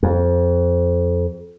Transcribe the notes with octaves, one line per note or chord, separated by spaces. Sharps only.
F2